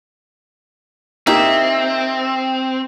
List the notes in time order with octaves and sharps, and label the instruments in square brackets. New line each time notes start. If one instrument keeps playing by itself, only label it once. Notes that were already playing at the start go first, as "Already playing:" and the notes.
[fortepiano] A#3 D#4 G4 [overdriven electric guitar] C4 [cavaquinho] E5